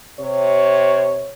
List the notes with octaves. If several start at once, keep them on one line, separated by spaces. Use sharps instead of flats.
C3 C#5